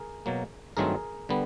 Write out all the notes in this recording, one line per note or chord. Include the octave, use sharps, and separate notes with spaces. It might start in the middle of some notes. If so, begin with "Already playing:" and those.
Already playing: G#4 A#4
B2 F#3 A#3
G2 D#3 F#3 A3 C4 G#4 A#4
D3 G3 B3